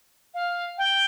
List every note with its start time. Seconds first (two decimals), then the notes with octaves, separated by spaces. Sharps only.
0.34 F5
0.78 G5